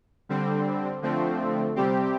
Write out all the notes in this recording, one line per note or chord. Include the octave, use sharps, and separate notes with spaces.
D3 G3 C4
D3 F3 A3 C4
C3 G3 C4 G4